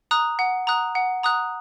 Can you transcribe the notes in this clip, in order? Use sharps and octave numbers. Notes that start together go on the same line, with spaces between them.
A#5 D#6 F#6
F#5
A#5 D#6 F#6
F#5
A#5 D#6 F#6